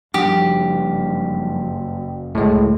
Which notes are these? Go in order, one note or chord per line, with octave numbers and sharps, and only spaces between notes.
F#1 F3 G3 D4 G4
C#2 A2 G#3